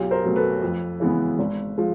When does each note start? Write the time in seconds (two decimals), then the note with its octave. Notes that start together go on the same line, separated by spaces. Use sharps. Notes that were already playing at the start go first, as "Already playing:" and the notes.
Already playing: B1 F4 G4
0.11 A#4 C5
0.24 B2 F#3 A3
0.36 A4 B4
0.62 F2
1.00 C#3 E3 G#3 B3
1.39 G#1
1.78 F3 G#3